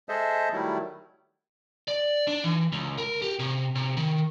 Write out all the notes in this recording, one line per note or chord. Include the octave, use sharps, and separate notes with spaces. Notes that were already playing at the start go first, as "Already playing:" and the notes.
G#3 G#4 A4 C5 D#5 E5
D#3 F#3 G3 A3 E4
D5
D4
E3
C#2
A#4
G4
C3
C3
D#3